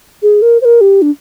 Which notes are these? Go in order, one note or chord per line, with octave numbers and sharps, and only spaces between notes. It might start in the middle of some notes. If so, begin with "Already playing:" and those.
G#4
A#4
C5
A#4
G4
D4